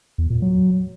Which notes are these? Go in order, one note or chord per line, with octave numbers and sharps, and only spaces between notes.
E2
A#2
F#3